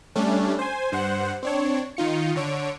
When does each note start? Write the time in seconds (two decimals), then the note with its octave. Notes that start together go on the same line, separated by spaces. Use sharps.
0.15 G3 A3 C#4 D4
0.59 C5 G#5
0.92 G2 C5 F#5
1.43 C4 D4 C#5
1.97 D#3 D#4 F4 C#7
2.36 D3 C#5 D7